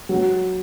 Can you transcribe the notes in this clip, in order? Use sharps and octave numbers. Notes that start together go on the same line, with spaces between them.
F#3